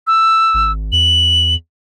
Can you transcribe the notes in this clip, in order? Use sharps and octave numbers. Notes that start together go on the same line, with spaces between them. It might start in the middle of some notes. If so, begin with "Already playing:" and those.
E6
G#1
E2 F#7